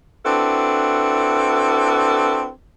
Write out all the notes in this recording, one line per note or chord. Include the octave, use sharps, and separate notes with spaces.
C4 D4 E4 F#4 A4 B4